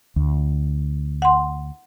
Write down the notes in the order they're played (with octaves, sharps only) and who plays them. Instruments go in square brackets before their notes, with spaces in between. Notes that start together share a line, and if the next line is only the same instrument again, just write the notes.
[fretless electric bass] D2
[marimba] F#5 C6